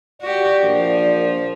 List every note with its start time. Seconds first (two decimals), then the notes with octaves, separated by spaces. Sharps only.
0.21 F#4 G4 D5
0.62 A#1 F3